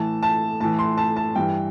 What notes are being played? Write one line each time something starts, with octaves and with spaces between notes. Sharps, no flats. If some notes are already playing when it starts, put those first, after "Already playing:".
Already playing: A2 E3 A5
A5
A2 E3 A5
C6
A5
A5
G2 E3 G5